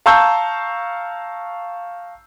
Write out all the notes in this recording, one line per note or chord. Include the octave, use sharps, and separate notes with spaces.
F5 A5 A#5 C#6 E6 G6